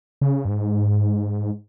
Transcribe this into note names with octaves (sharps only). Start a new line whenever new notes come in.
C#3
G2
G#2